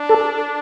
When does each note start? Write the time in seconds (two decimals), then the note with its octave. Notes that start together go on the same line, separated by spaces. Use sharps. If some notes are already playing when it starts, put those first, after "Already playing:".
Already playing: D4
0.09 A4